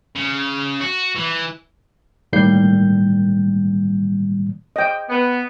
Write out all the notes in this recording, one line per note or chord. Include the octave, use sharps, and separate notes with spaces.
C#3
F#4
E3
A2 D#3 G3 A#3 G6 C7
D#5 G5
B3